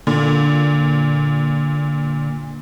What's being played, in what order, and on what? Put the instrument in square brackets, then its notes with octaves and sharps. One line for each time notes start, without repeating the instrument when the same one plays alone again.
[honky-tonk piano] A#2 [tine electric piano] D3